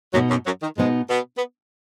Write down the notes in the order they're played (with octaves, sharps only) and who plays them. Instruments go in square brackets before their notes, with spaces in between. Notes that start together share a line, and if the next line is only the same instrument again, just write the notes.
[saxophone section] F#2 F#3 [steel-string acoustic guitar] B2 B3 D#4
[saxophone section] F#2 F#3
F#2 F#3
D#3
[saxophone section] G#2 G#3 [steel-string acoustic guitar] B2 B3 D#4
[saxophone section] B2 B3
B3